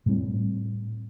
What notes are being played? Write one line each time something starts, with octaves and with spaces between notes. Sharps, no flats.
A2 G3 C4